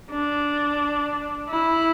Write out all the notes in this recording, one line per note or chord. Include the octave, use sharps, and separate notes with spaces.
D4
E4